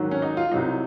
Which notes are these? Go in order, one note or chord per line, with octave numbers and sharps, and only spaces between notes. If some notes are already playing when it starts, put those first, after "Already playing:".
Already playing: G#2 D#3 F#3
C#4
D#4
F4
C2 C3 F#3 D#4